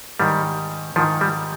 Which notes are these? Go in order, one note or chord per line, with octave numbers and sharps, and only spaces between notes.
G#2 D#3 G3
G#2 D#3 F3
G3